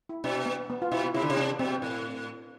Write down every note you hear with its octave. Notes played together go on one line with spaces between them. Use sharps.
E4
B2 D4
B3
B3
F4
B2 E4
C3 E4
D3
C3
D4
B2 C4
A2